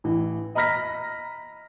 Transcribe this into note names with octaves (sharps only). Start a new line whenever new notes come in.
A1 E3
D#5 A#5 B5 F6 A#6 B6